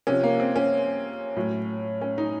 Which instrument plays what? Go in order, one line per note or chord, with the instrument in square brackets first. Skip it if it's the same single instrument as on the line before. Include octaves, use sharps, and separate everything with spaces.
[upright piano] C3 F3 C#4
A#3
C4
C#4
A2 F#3
C#4
D#4